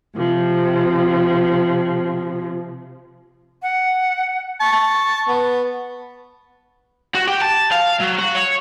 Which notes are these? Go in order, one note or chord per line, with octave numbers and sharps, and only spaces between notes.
C3 F3
F#5
A5 C#6
B3
F#4
G4
A5
F5
F#3
F#4
C#5